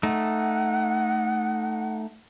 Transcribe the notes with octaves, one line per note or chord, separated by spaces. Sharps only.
A3 D#4 F#5